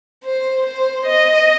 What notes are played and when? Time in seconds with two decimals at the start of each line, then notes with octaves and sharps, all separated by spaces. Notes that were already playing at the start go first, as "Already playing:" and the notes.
0.25 C5
0.66 C5
1.08 D#5